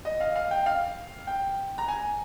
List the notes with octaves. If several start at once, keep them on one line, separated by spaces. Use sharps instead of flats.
D#5
F5
F5
G5
F5
G5
A#5
G#5